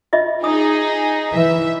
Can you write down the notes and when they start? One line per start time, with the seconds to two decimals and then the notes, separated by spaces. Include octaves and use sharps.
0.13 F4 D#5 E5
0.44 D#4 G#4 D#6
1.33 E3 E5